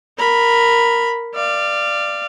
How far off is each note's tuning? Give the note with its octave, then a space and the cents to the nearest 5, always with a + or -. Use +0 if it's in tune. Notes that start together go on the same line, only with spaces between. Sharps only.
A#4 +0 B5 +0
D5 +15 F5 -20